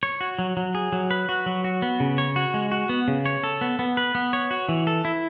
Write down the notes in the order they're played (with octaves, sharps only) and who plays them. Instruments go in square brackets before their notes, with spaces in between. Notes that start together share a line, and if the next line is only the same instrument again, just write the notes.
[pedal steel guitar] C#5
F#4
F#3
F#3
G#4
F#3
B4
F#4
F#3
F#4
B3
C#3
C#5
F#4
G#3
F#4
B3
C#3
C#5
A4
B3
B3
B4
B3
C#5
F#4
E3
A4
E4